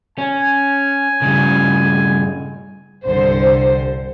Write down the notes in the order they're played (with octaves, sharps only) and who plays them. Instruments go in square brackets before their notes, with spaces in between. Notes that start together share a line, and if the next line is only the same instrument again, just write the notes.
[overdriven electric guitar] C#4 [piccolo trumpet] G#5
[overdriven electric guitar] G2 C#3
[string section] C2 G2 D3 C5